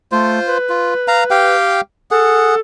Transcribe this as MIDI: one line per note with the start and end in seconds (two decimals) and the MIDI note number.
0.12 0.39 57
0.12 0.58 65
0.12 0.58 72
0.46 1.56 71
0.69 0.94 65
1.08 1.24 77
1.08 1.24 82
1.30 1.81 67
1.30 1.81 77
1.30 1.81 79
2.11 2.55 68
2.11 2.60 69
2.11 2.55 78